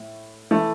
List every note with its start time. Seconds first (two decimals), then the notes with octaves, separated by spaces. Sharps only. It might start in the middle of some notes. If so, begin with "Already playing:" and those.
Already playing: A2
0.51 E3 A3